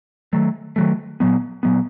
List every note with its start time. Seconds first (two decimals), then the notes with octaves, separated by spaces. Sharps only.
0.33 D#3 F#3 A3
0.76 D#3 F#3 A3
1.20 A#2 F#3 B3
1.63 A#2 F#3 B3